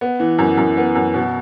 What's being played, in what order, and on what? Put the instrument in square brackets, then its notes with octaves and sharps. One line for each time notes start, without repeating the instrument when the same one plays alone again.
[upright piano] B3
E3
F#2
F#2
B3
F#2
B2